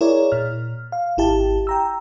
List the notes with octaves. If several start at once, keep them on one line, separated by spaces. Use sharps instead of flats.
E4 G#4 A#4 C#5 D5
A#2 F6
F5
G#1 E4 G4 A5
G5 A#5 E6